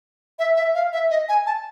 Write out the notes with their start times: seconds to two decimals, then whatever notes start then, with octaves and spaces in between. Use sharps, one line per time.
0.39 E5
0.57 E5
0.75 F5
0.93 E5
1.10 D#5
1.29 G#5
1.46 A5